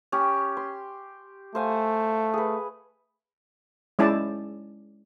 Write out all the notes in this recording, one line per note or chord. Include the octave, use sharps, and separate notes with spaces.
C#4 G4
C6
A3 C5 F5 G#5
G#4 B4
G#3 C#4 E4 D5 A5